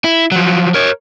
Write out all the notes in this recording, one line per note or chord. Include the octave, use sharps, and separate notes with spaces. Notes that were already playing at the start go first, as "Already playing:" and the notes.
E4
F3 F#3
A#4 C#5